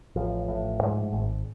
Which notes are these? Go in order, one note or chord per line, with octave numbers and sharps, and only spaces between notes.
A1 F3
A2
G#2
G#1